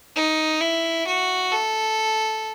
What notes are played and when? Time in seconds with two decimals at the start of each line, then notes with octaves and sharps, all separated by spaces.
0.16 D#4
0.61 E4
1.07 F#4
1.52 A4